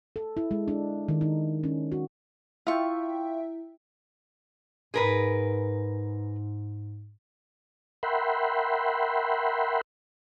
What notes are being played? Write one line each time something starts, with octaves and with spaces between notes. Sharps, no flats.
A4
E4
G#3
D4
D#3
D#4
C#4
F#4
E4 F4 E5 G5 C#6
G#2 G#4 A#4 B4
A#4 E5 F#5 G5 B5 C6